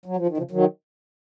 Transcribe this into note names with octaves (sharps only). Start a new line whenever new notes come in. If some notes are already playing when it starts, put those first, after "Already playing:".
F#3
F3
D#3
C#3 F3
D#3 F#3